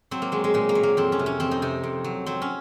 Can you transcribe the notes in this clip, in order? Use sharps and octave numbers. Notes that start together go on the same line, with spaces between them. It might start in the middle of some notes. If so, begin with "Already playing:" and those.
F#3 C4
A#3
F#3 G#3
G#3
A#2 G#3
A#3
F#3
A#3
F2 C4
C#4
C3
C#4
F2 C4
D#4
C3 D#4
F2
F#3
F#3 C4
C#4